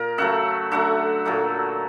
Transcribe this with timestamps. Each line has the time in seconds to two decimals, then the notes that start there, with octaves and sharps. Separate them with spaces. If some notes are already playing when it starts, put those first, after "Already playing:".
Already playing: A#2 A#4
0.18 C#3 F#3 A3 E5 F#5
0.71 D3 F#3 A3 E5 F#5
1.25 A#2 F#3 A3